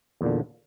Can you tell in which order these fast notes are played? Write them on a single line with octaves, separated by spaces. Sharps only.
E2 A#2 D3